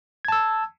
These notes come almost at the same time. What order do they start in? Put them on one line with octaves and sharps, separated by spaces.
G#6 A5 E6